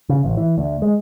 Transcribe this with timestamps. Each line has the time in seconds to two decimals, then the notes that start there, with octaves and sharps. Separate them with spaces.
0.09 C#3
0.24 A1
0.37 E3
0.58 D2
0.82 G#3